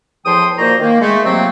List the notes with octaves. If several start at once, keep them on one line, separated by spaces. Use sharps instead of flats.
E2 A2 F3 G5 C6 D#6
A#2 D#3 A#3 F#4 C5 A#5
D#3 A#3
G#3 A3
C3 F3 F#3 A3 A#3 C4